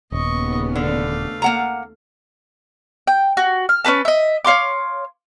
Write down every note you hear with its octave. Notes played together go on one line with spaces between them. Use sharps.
D#1 D#2 C#3 B3 D#5 C#6
D3 A3 F5
A#3 F#5 A#5
G5
F#4
F6
C#4 D#4 B4 A5
D#5 E5
C#5 F5 C6 D6